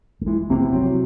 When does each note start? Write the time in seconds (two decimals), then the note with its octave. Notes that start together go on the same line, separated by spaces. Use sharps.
0.21 A3
0.26 E3 G#3
0.50 C3 A#3
0.61 B3
0.73 F#3 C4